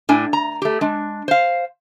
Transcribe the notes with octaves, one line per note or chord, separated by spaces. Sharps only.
A2 D4 G#5
A#5
A3 G4
G#3 D4
C5 F5